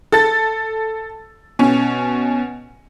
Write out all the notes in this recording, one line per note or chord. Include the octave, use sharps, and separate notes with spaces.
A4 A6
B2 C#4